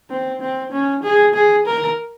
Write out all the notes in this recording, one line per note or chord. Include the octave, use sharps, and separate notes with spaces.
C4
C4
C#4
G#4
G#4
A#4